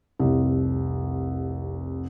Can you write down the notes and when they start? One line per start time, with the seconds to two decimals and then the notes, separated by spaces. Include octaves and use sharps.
0.20 F1 C2